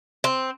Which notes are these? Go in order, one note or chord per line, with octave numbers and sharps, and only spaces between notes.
C4